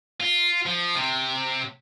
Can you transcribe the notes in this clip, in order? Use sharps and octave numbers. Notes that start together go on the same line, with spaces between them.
F4
F3
C3